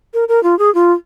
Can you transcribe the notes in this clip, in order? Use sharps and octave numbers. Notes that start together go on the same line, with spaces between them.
A#4
A#4
F4
G#4
F4